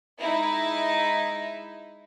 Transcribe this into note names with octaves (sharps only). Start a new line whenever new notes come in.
G#3 D#4 E4